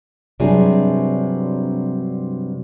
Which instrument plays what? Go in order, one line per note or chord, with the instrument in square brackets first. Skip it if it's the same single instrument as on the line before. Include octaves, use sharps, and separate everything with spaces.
[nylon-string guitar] G2 C3 F#3 C4 D4 G#4